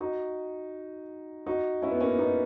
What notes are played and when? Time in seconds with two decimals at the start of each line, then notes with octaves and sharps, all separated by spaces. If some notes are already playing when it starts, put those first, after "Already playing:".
0.01 D#4 F#4
1.46 D#4 F#4
1.82 C#4 E4
1.91 B3
2.00 A#3 C#4
2.19 B3 D#4